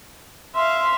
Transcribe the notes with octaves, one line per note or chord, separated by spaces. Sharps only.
E5 F5 C6